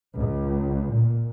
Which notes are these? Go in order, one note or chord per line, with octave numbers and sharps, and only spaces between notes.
C#2
A#2